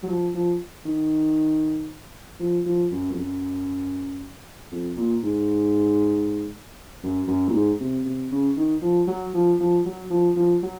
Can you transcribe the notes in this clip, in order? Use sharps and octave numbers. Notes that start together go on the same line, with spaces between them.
F#3
F3
F3
D#3
F3
F3
F#2
F2
F#2
F2
A#2
G#2
F#2
F#2
A#2
G#2
C3
C3
C#3
D#3
F3
F#3
F3
F3
F#3
F3
F3
F#3